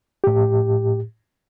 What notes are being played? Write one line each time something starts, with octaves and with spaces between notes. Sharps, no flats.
A2 G4